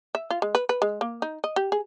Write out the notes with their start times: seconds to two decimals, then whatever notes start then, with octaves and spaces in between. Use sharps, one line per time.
0.15 E5
0.30 F4
0.42 G#3
0.55 B4
0.69 B4
0.82 G#3
1.01 A#3
1.22 D#4
1.44 D#5
1.56 G4
1.72 G#4